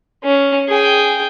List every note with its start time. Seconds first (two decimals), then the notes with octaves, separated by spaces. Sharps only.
0.24 C#4
0.68 G#4 G5